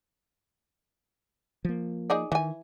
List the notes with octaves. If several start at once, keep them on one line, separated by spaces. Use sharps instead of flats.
F3 A#3
D#4 G#4 D5
D#3 E3 G#5